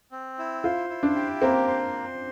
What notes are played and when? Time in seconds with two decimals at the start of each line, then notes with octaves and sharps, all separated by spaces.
0.12 C4
0.39 E4
0.64 F4 C5
0.90 E4
1.03 D4
1.15 G4
1.42 A#3 C4
1.67 C5